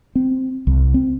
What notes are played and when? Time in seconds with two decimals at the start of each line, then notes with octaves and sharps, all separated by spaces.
0.15 C4
0.67 C2
0.94 C4